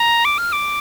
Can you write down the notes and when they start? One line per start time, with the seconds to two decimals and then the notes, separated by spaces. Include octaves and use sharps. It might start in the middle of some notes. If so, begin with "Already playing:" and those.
Already playing: A#5
0.25 D6
0.38 F6
0.52 D6